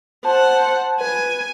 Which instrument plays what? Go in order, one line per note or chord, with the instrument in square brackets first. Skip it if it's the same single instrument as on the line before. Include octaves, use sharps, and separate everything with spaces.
[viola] C5 F#5 [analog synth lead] A5
[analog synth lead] B4 [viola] G#5